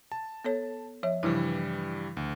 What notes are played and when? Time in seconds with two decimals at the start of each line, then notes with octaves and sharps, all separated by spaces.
0.12 A5
0.45 B3 A4 C#5
1.03 F3 C#5 E5
1.23 G2 C#3 E3 F3 G3 E4
2.17 D2